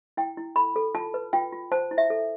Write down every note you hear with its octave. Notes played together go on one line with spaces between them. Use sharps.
E4 G5
E4
A4 B5
A4
F4 A5
B4
F4 G5
F4
C5 A5
E4
E5
A4